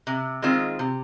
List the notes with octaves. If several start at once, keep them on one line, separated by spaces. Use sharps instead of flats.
C3
D#3 G#3 C4 F4
C3